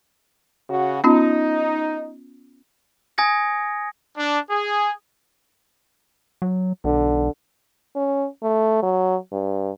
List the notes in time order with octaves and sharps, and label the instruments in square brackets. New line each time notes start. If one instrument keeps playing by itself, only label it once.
[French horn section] C#3 F#4
[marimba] B3 C#4 F4 [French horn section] D#4
[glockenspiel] G#5 D#6 G#6 A#6 C#7
[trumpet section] D4
G#4
[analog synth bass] F#3
[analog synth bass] B1 [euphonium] D3
[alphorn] C#4
A3
F#3
G2